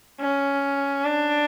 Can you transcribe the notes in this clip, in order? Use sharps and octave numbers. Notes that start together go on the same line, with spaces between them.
C#4
D4